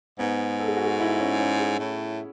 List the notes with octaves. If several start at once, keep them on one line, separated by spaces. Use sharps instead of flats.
G#2 B3
A4
G#4
F#4
G#4
E4
C#4
C#4
G#4
A2